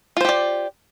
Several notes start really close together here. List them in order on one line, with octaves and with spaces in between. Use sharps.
F4 C5 G4 D5